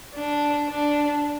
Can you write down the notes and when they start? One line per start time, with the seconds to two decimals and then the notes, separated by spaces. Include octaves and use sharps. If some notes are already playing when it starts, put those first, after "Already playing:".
0.15 D4
0.69 D4